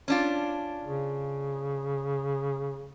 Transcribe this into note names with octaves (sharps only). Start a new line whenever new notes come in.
C#4 D4 F4
C#3